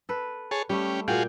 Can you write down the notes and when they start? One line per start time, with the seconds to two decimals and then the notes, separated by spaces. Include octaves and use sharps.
0.09 A4 B4
0.51 G#4 C#5 A5
0.69 G3 A3 C#4 G4
1.08 A#2 F4 F#4 G#4 G5